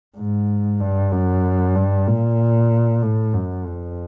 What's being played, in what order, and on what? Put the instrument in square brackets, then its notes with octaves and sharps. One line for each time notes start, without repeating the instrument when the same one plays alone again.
[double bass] G#2
G2
F#2
G2
A#2
A2
F#2
F2